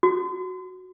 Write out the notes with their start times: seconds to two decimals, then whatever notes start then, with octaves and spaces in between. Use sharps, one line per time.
0.03 F#4